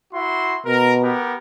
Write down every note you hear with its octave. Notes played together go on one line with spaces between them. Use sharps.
E4 F#4 C6
B2 A#4
B3 G4 A#4